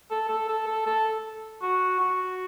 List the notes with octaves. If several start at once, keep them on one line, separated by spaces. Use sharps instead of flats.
A4
A4
A4
A4
A4
F#4
F#4